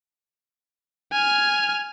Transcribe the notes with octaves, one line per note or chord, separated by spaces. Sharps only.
G#5 F6